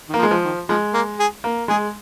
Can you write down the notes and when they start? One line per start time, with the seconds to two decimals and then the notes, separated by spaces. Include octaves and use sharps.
0.09 D#3 A#3
0.18 F3
0.23 G#3
0.31 F3
0.44 D#3
0.69 F3 G#3
0.94 A#3
1.19 G#4
1.44 A#3
1.68 G#3 G#4